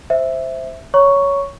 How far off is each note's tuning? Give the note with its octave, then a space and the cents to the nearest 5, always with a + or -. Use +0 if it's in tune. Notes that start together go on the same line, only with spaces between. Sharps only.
C5 +0 E5 +0
C#5 +10 A#5 +20 C#6 +5